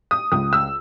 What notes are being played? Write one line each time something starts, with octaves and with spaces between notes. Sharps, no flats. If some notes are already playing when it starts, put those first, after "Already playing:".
D#6
C#2 D#6
E6